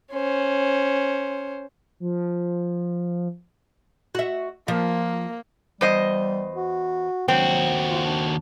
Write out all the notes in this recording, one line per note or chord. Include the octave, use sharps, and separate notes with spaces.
C#4 C5
F3
F#4 E5
F3 A#3
E2 G3 C5 D#5
F#4
D#2 F#3 C4 F#4
F4
D4